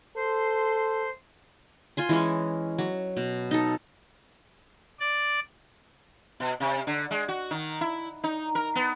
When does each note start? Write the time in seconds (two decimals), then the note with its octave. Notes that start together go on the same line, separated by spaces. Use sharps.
0.17 A4 C5 C6
1.97 F4 G#5 C6
2.09 E3 G#3 C#4
2.78 F#3
3.17 B2
3.51 D#4 A4
5.00 D5
6.40 B2
6.60 C3
6.87 D3
7.11 G#3
7.28 F#4
7.51 D#3
7.81 E4
8.24 D#4
8.55 A#4
8.75 B3